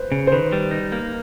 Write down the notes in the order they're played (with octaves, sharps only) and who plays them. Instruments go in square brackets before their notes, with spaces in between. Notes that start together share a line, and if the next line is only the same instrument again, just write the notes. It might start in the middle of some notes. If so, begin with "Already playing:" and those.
Already playing: [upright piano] B4 C5
[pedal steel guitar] C#3
[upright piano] C5
[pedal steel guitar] D#3 [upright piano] B4
[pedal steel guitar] G3
D#4
A#3